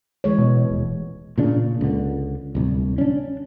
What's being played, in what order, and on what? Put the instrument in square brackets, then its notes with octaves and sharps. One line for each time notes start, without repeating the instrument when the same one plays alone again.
[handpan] E3 G#3 C#5
[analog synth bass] B2
D#1
[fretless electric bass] A#2 C#3 D4
C#2 D3
D1 C2
C#4 D4